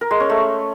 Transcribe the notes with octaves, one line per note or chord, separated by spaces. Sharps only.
A#4
G#3
C#4
A3